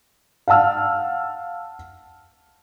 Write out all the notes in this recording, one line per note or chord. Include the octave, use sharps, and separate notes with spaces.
F5 F#5 A5 E6 F6